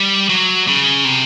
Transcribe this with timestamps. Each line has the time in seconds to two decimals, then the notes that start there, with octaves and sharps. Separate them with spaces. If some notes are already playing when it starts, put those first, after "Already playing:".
Already playing: G3
0.29 F#3
0.68 C#3
1.05 C3